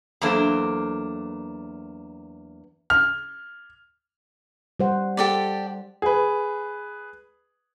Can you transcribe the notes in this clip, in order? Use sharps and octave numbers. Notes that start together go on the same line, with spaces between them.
E2 F#3 A#3 D4 A4 C5
F6
G3 C5 F#5
G4 A4 D5
G#4 B4